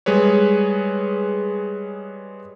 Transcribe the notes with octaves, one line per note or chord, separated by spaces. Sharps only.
G3 G#3 G#4 B4 C#5